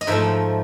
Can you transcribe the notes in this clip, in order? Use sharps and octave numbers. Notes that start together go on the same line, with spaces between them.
D#5
G#2 F3 A3 E5